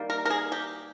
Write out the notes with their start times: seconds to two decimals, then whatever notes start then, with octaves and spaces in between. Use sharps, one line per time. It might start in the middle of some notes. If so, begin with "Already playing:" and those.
Already playing: D#3 G3 A#3
0.10 A#4
0.25 A#4
0.30 G#4
0.52 G4